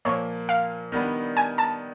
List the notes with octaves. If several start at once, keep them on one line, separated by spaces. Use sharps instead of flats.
A#2 F3 A#3 C#5
F5
D#3 G3 B3 D4
G#5
A5